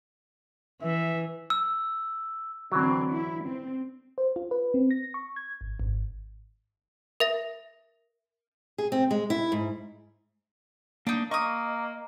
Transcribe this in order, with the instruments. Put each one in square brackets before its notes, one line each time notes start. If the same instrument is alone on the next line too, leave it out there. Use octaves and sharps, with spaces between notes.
[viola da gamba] E3 [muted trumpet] E5
[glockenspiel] E6
[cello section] D3 C4 [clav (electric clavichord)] E3 F#3
[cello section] E4
C4
[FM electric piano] C5
F4
B4
C4
A#6
C#6
G#6
G#1
G#1
[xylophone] A#4 E5 A#6
[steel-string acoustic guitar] G#4
C4
G#3
E4
G#2
[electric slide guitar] A#3 [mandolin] D4 D#4
[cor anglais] A#3 [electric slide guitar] D#5 [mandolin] C#6 D#6